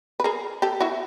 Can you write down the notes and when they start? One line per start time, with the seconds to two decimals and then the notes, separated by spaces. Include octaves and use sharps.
0.20 B4
0.24 G#4 A#4
0.62 G4 A4
0.80 E4 F#4